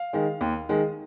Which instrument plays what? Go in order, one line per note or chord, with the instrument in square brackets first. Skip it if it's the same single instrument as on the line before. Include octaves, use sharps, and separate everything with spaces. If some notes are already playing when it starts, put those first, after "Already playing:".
Already playing: [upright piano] F5
D#3 G#3
D#2
D#3 G#3